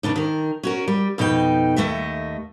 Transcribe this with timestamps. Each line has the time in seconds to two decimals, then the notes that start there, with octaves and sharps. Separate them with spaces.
0.03 D#2 C#3 D4 D#4
0.16 D#3 A#4
0.63 C#4 F#4 A#4
0.88 G3
1.18 F2 B2 D#4 A#4 G5
1.76 D#2 B2 A3 D#5 E5